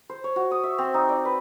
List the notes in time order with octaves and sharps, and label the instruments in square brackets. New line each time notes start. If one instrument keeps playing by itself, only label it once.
[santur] C5
C#5
F#4
D#6
E5
C4
D#4
D5
B4